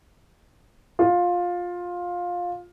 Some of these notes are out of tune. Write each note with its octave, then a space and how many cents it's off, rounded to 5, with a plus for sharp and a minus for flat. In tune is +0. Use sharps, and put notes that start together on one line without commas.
F4 +15